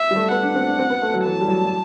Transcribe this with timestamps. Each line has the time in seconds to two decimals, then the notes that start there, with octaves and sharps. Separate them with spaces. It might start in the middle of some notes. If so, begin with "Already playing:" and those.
Already playing: E5
0.11 G3
0.16 A3
0.31 B3 F#5
0.43 D4
0.55 C4
0.66 D4
0.79 C4
0.90 B3
1.02 A3
1.14 F#3
1.25 E3 A5
1.41 G3
1.48 F#3
1.65 F#3